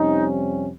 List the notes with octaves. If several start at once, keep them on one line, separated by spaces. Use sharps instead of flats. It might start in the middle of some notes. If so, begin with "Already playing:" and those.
Already playing: F2 C3 G3 C#4 D#4